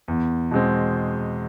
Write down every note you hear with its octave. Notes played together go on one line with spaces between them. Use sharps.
E2
B2 G#3 C4